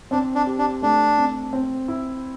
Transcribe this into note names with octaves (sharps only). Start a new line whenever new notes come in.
C4 D4
D4
G4
D4
A3 D4
C4
C4
E4